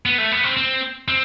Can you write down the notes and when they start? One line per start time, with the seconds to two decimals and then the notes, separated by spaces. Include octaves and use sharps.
0.06 B3
0.18 A3
0.32 B3
0.44 C4
0.57 C4
1.08 C4